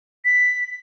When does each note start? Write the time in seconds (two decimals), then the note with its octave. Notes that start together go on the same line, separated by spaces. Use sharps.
0.25 B6